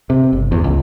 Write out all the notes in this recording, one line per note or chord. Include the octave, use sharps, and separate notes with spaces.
C3
G1
E2
C#2